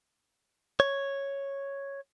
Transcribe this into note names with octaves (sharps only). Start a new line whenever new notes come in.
C#5